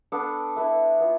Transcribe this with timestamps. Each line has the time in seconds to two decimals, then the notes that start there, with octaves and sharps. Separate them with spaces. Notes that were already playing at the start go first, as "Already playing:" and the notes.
0.12 B3 D4 A4
0.56 E4 B4 E5
1.00 B3 F4